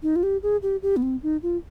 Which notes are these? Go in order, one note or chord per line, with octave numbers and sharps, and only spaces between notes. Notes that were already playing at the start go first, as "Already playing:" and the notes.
D#4
F4
G4
G#4
G4
G4
B3
C4
D#4
F4